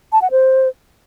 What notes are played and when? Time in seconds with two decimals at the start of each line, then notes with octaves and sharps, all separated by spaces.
0.12 A5
0.22 F#5
0.31 C5